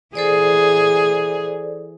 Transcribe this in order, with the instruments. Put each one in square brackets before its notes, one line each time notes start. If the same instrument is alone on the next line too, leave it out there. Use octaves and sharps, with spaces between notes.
[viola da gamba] E3 G#4 [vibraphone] A4 C5 D5